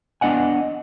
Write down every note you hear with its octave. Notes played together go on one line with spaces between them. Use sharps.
B3 D4 D#5 F#5 G#5